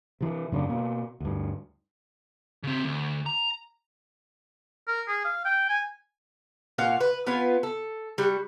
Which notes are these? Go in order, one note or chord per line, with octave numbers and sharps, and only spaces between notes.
C3 E3
F#2 C#3 A#3 D4
B2 A#3
D2 G2
C#3 C4
D2
A#5
A#4
G#4
F5
G5
G#5
A#2 F#4 F5
B4
B3 F4 B4 G#5
A4
G3 F#4